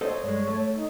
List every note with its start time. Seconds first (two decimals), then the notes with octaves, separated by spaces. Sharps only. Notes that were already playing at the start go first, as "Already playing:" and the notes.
0.01 A4 C5 C#5 D#5
0.24 G2 G#3 C#5
0.47 A3
0.74 D#4